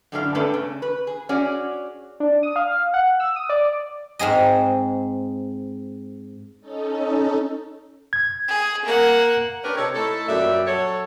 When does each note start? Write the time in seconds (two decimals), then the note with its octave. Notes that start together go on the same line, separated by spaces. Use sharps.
0.12 F#2 A2 D3 D4 G4 F5
0.35 G2 A3 C#4 A4 B4 D5
0.54 C#3
0.82 B4
1.07 G#4
1.29 C#4 F#4 G#4 D5
2.20 D4
2.43 D#6
2.56 F5
2.94 F#5
3.20 E6
3.36 D#6
3.49 D5
4.19 G#2 C4 G#4 D#5
6.61 C#4 D#4 A4
8.13 G#6
8.48 G#4
8.85 A#3 F#5
9.64 C#4 D4 G4 A#4 B4 C#5
9.77 C3 D#4 A4 C#5
9.95 A3 D#4 E4 A4
10.29 F#2 A#2 G3 D5 E5
10.67 F#3 A4 C#5